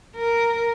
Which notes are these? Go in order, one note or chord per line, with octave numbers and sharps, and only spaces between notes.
A#4